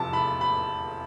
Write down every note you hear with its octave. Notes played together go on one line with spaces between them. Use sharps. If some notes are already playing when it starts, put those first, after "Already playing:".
Already playing: F1 E2 C3 F3 A5
B5
B5